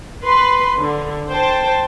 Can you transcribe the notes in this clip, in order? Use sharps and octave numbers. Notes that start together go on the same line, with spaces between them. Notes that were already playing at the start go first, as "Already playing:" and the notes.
B4 B5 C6
D3
C5 G5 A5